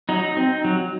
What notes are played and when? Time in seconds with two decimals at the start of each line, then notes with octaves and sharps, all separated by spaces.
0.09 F#3 D#4
0.37 C4
0.65 F#3